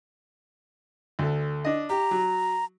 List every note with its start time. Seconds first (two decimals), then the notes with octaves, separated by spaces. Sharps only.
1.19 D2 A4
1.65 D4 D#5
1.90 G4 A#5
2.11 F#3